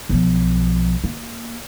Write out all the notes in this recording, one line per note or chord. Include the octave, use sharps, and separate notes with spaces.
B1 F3
A#3